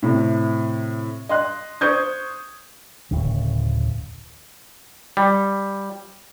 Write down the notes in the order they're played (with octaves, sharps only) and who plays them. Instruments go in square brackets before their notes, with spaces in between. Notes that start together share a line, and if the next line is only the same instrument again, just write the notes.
[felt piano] A2 C3
D#5 C6 F#6
C5 C#6 D#6 G6 G#6
[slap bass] D1 C#3
[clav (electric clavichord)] G3